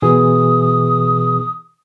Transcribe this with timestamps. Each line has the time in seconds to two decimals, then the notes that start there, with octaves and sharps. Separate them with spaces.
0.02 B2 E3 G#4 D#6